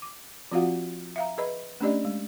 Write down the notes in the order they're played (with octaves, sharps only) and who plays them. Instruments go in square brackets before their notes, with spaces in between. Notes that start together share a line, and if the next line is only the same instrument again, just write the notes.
[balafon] D6
F3 C4 F4 F#4 F5 F#5
E5 F5 A#5
G#4 B4 D#5 B5
A3 C#4 D4 G4 D5 D#5
G#3